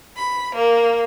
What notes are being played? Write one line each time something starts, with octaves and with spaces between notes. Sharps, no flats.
B5
A#3